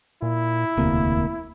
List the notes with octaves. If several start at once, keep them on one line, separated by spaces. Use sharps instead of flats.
A#2 E4
E1 D2 C3 A#3